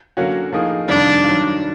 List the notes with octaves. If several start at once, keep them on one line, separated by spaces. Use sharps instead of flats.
D3 F#3 A#3 C#4 F#4
A2 F3 A#3 D#4 G#4
F2 C3 D#3 G3 D4
G2 D#3 F#3